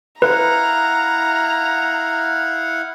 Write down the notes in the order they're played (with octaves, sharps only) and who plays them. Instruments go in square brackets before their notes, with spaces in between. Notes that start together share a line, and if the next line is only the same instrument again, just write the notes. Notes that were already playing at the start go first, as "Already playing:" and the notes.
[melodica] E4 F5 F#5 [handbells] B4 [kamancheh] A#5